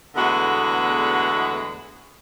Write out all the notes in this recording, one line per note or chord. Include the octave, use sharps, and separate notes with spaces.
E2 D3 G#3 A3 B3 F#4